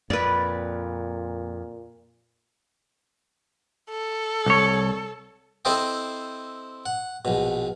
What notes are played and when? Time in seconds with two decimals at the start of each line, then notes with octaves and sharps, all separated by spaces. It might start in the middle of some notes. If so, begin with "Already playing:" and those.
0.10 F2 A#2 B4 D5
3.90 A4
4.46 C2 C#5
5.65 C4 E4 A4 C5 D#5 G5
6.86 F#5
7.25 A#1 B2